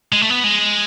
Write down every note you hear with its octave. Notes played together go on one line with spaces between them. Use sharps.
G#3
A3
B3
G#3